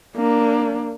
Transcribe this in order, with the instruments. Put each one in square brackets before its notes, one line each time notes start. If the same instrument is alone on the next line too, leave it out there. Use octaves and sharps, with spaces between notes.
[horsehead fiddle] A#3 D4